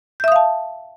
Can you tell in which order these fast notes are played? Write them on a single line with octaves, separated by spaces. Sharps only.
G6 E5 D#6 F5 A5